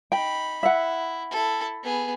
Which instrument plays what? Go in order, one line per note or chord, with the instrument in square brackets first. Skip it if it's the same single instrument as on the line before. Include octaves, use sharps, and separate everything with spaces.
[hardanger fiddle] D#4 B5 [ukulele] G5
[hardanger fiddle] E4 [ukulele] E5 F#5
[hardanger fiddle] E4 A4
B3 G#4